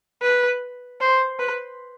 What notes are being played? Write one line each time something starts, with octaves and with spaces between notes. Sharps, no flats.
B4
C5
B4